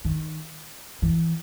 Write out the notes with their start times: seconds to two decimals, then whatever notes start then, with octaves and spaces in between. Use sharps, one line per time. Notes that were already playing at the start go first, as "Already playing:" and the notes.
0.05 D#3
1.02 E3